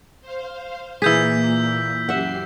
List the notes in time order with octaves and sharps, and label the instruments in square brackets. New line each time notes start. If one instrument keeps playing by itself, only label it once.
[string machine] C5 F5
[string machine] A#2 A#3 [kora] E3 G#4 [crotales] E6 G6 B6
[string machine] F#2 G4 C7 [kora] E5 F#5